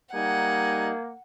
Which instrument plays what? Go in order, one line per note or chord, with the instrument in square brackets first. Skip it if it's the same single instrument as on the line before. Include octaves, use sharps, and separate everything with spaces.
[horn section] G3 D#4 [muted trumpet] A#3 [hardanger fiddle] F#5 [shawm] G#5